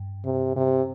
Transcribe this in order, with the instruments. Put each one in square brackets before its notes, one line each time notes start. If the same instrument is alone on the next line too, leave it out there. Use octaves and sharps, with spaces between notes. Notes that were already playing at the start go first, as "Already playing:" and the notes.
Already playing: [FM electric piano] G2
[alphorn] C3
C3